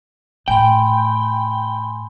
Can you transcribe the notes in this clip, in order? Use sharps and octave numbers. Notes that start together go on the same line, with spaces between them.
A2 G5 G#5 B5 C6